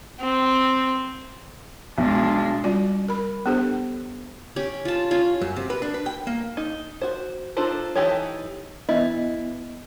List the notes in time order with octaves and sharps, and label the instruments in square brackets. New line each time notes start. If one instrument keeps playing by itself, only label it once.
[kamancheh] C4
[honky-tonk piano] B1 [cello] G#3 D4
[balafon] G3 C#4 F4 F#4 D5
A#4 B5
B3 D4 G4 A4 C5
[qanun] C#4 G4
F4 A5
C#4 F4
[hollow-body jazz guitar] F#2
C3
B4
D4
B4
G5
A#3
[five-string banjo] D#4
F#4 C5
D4 D#4 F4 A4 C5
E3 D#4 G4 A4 C#5
[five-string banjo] E3 E4 [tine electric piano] B3 [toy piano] D#5